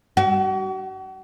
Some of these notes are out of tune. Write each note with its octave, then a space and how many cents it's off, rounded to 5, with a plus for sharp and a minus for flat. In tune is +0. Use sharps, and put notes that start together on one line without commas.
F#4 +40